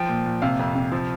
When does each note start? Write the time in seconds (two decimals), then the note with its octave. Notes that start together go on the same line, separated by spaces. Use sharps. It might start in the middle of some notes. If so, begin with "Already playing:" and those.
Already playing: F3 G5
0.09 A#2
0.26 A#2
0.42 C3 F5
0.59 F2
0.75 C3
0.92 F3